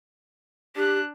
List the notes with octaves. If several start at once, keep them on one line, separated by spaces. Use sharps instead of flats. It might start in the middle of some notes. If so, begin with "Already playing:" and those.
D4 G4 F#6